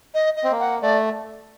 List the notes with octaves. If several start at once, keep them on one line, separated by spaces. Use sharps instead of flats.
D#5
D#5
C4
A#3
F#5
A3 D5